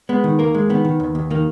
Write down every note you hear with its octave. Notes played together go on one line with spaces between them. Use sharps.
G#3 B3
D#3
D#2 A#3 A#4
G#3
D#3 B3
D#3
D#2
D#2
D#3 A#3